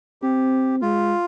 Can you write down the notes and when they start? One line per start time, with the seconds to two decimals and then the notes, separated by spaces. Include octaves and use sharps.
0.22 C4 G4
0.82 G#3 F4